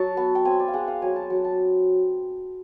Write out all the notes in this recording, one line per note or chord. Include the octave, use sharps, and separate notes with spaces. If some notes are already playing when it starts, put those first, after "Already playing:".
Already playing: F#3 A5
B3
G5
C4 G#5
D5
F5
G#3 F#5
F5
F#3 G#5
A5
F#3
A5